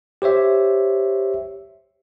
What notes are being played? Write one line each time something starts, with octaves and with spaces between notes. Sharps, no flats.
G4 C5 C#5 E5